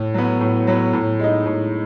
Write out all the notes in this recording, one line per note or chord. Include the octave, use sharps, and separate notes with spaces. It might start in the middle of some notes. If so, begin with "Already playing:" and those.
Already playing: A2
F#3 B3
A2
F#3 B3
A2
G#3 D#4
A2